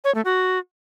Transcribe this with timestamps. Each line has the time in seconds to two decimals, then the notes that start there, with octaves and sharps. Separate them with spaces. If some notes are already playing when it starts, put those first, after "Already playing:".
0.04 C#5
0.15 A3
0.25 F#4